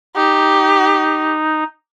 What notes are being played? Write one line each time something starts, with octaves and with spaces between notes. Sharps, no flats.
D#4 G4